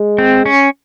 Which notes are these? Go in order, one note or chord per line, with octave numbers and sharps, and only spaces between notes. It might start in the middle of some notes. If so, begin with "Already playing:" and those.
Already playing: G#3
C4
C#4